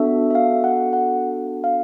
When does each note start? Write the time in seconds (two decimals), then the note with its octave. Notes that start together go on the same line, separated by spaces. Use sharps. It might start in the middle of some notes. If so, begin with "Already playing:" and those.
Already playing: B3 D4 F#4 A4 E5
0.30 E5
0.35 F5
0.64 F#5
0.93 F#5
1.64 F5